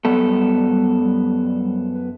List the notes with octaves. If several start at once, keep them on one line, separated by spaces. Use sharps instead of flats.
F#2 G3 B3 A4
G3
B4